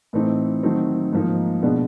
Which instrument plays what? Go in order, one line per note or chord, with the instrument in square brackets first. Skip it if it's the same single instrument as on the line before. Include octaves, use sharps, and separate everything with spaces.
[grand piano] A2 E3 A3 C4 D#4
D#3 F#3 A3 C4 D#4
G#2 F3 A#3 D#4
B2 G#3 B3 D4